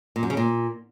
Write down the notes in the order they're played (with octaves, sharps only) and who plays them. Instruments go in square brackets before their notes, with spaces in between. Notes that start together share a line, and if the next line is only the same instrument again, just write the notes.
[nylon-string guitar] A#2
F#2
C#3
A#2